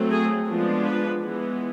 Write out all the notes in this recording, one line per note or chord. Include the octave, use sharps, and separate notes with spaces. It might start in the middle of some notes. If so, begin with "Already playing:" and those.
Already playing: F#3 A3 C4
G#4
F3 G#3 B3 D4
B4
E3 G#3 B3